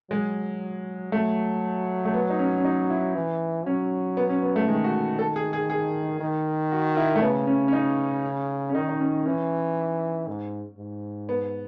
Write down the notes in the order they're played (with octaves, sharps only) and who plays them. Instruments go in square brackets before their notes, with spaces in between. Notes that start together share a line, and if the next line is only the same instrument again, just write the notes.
[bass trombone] F#3 [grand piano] G#3
[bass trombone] F#3 [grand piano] A3
[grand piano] A3
B3
D#4
C#4
C#4
D#4
E4
[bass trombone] E3
[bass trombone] F#3 [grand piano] C#4
[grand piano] B3
C#4
B3
A3
[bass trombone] D#3 [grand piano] G#3
[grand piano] F#4
A4
G#4
G#4
G#4
[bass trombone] D#3
[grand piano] F#4
E4
A3
[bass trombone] C#3 [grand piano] B3
[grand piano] C#4
C#4
D#4
C#4
[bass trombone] D#3 [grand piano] D#4
[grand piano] D#4
C#4
[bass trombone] E3 [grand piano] C#4
[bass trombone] G#2
G#2
[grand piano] B3